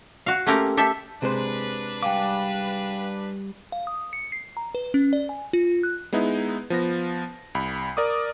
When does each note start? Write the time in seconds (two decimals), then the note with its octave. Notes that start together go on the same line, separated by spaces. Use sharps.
0.26 F#4 F5
0.46 A3 A#3 C4 C#4 G4 A#4
0.77 G4 A4 E5
1.22 C3 G#3 D4 B4 C5
2.03 G3 F5 G5 G#5 D6
3.72 F5
3.87 D#6
4.13 C#7
4.32 C7
4.57 A#5
4.75 B4
4.94 C#4
5.13 D5
5.29 G#5
5.53 F4
5.83 F#6
6.13 G#3 B3 D#4 E4
6.70 F3 B3 A#6
7.55 C2 B5
7.97 A#4 D5 D6 D#6